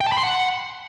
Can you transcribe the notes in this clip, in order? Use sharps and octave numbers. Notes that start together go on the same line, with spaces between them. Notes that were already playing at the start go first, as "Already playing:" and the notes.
G5
A5
B5
C6
F#5